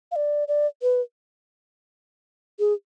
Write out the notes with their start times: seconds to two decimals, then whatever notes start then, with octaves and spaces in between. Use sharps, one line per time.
0.12 F5
0.16 D5
0.48 D5
0.82 B4
2.59 G#4